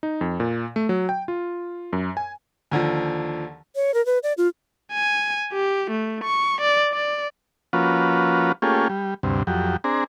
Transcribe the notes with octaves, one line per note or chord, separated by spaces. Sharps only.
D#4
F2
A#2
A3
F#3
G5
F4
F#2
G#5
D#2 D3 F3
C#5
A#4
B4
D5
F4
G#5
G4
A3
C#6
D5
D5
F3 A#3 C#4 F4 F#4 B4
A3 A#3 C#4 F4 G4 G#4
G3
D2 G2 C3
F2 F#3 G4
C4 D4 G#4 A#5